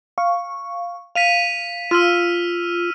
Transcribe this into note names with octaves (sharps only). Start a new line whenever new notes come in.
F5 C#6
F5 B6 D#7 F7
F4 E6 F6 D#7